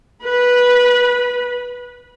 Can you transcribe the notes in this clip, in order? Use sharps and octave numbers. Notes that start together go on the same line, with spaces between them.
B4 B5